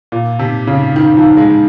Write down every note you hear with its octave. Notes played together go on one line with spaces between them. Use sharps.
A#2
C3
C#3
D#3
F3
G#3